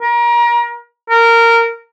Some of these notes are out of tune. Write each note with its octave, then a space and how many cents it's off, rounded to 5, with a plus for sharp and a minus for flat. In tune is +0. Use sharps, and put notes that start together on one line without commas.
A#4 +30
A#4 -15